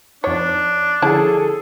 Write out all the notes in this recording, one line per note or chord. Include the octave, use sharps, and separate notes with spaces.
F2 D4 D#4 C#5
D3 F3 C#4 E4 G#4 A4 A5